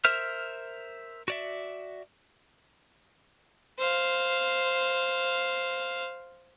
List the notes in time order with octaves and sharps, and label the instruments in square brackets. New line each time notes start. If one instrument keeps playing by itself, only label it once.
[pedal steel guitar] A#4 C5 E5 F6
F#4 D5 E5
[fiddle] C5 F5